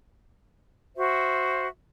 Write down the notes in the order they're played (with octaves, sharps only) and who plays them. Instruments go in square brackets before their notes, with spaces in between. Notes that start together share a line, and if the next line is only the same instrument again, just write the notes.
[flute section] F#4 C5 E5